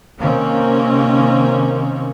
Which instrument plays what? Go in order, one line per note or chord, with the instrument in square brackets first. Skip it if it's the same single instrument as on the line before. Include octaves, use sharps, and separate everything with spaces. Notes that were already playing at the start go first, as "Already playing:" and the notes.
[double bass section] C3 D#3 A#3 C4 C#4